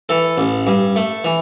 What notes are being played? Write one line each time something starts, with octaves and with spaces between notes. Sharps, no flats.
E3 A4
A1
G2
A3
E3